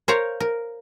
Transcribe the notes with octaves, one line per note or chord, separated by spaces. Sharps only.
A#4 C5 C#5 F5 A#5
A#4